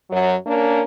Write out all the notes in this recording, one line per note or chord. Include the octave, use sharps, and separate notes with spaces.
F#2 F#3
A#3 C#4 D4 A#4